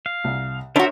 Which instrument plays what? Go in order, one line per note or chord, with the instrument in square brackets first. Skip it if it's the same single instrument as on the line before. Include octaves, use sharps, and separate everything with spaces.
[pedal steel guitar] F5
[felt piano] C2
[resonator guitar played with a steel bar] D4 F#4 [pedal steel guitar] A#4 C5 E5 [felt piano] C#5